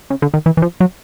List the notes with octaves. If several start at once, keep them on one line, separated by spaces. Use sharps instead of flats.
C#3
D3
D#3
E3
E3
F3
F#3